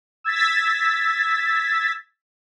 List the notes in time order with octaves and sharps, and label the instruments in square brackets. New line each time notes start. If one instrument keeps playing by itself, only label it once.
[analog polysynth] E6 G#6 A6 B6